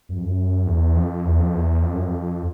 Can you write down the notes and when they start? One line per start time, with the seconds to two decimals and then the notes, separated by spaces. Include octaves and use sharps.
0.09 F#2
0.16 F2
0.23 F#2
0.67 E2
0.96 F2
1.25 E2
1.39 F2
1.54 E2
1.83 F2
1.95 F#2
2.06 F2